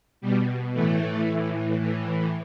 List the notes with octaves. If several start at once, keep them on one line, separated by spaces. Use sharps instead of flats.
B2 G3
A2 E3 A3
A2 E3
A2 E3